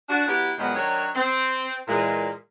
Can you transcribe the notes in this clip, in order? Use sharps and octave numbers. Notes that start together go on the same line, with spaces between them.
D4 F#4
F#3 B3 E4 G4
A#2 D#3 F3 F#3 G#3 B3
D#3 F#3 D4 C#5
C4
A#2 E3 G#3